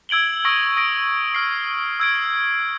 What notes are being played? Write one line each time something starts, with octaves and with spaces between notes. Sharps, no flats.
E6 G#6 D7 F#7 G7
C#6 D#6 E6 A#6 D7
D#6 A#6 D7
F6 C7
E6 G#6 D7